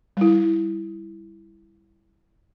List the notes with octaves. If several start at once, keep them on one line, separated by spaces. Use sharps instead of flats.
G3 E4